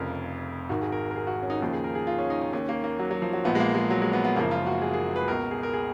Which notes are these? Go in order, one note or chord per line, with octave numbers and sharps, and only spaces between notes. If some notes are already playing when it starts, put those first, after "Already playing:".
Already playing: F1 F2 C#3 F3 A#4
G#1 G#2 D#3 F#4
G#4
A#4
A#4
G#4
F#4
C#4
D#4
D#2 C#3 F3 D#4
G#4
A#4
G#4
F4
C#4
D#4
D#4
D#2 D#3 C#4
A#3
A#3
F#3
F#3
F3
F#3
A#1 A#2 F3 B3
G#3
A#3
G#3
F#3
G#3
B3
B3
F#1 F#2 C#3 F3 A#3
F4
F#4
G#4
G#4
B4
C#2 B2 A#4
G#4
A#4
G#4